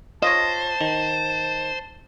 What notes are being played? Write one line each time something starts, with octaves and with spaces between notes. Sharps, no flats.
F4 C5 C#5 D#5 A5
D#3